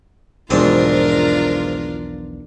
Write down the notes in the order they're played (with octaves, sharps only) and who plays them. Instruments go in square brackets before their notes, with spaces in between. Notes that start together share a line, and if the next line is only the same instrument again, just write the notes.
[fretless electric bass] B1 E2 F3 [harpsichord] G#2 C4 [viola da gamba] D4 F4 A#4